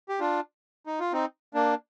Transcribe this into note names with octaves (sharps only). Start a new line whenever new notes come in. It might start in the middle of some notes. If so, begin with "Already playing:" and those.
G4
D4 F4
D#4
F4
C4 D#4
A#3 D4